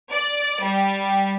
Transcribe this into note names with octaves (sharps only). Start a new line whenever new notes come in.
D5
G3